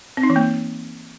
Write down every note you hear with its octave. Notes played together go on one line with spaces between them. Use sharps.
C4
D#4
E3
A#3